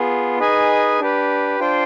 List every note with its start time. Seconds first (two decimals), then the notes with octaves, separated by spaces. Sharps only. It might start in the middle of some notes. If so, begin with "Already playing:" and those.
Already playing: B3 F4 G#4
0.39 D#4 G#4 B4 D#5 G#5
1.00 D4 G4 B4
1.60 D4 F4 C5 G5